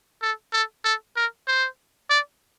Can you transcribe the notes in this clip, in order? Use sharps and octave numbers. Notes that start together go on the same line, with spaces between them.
A4
A4
A4
A#4
C5
D5